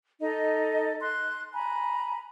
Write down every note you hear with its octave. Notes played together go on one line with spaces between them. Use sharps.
D#4 A4 D#5
C6 F#6
G#5 A#5 B5